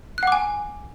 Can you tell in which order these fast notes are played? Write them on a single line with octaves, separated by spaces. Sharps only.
F#6 F#5 D6 G#5